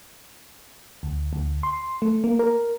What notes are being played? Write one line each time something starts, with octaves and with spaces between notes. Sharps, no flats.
D2
D2
C6
A3
A#3
A#4